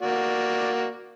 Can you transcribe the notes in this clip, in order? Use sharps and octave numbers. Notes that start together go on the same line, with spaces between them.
A#3 F#4 D5